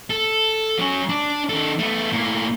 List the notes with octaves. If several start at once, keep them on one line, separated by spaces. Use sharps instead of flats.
A4
F#3 C#4
D4
D#3 A4
A3 B3
A2 A#3